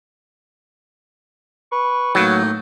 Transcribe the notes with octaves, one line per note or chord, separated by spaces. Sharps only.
B4 C#6
A2 F#3 A#3 D#4